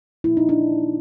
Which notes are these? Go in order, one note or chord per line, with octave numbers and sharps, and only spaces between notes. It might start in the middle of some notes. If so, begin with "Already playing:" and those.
A#2 F3 A#3 E4
D#4
D4 E4